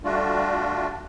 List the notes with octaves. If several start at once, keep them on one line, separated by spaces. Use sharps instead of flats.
G3 A3 D4 F4 F#4